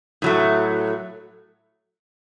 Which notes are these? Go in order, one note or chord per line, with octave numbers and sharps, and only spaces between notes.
A2 F#3 A3